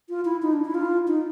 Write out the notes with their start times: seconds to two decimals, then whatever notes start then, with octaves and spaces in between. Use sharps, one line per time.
0.09 F4
0.25 E4
0.42 D#4
0.53 D4
0.65 E4
0.74 F4
1.08 D#4